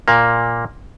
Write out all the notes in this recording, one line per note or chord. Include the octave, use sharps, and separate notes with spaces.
A#2 A#3